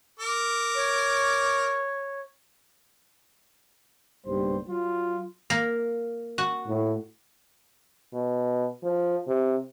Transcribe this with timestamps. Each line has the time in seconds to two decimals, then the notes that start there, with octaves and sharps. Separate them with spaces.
0.20 A#4 D6
0.75 C#5
4.25 F#1 B1 G2 G3 C5
4.69 F#3 F4
5.50 A#3
6.38 F#4
6.67 A2
8.13 B2
8.83 F3
9.27 C3